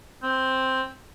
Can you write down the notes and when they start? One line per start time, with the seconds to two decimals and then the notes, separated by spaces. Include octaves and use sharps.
0.23 C4